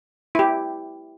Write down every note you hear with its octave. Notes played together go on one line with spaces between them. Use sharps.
E4 G4